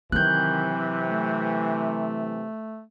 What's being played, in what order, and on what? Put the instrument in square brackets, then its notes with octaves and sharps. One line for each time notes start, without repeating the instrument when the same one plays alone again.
[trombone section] C3 E3 [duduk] D#3 [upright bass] F#3 C4 [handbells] F#6 G6
[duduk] A3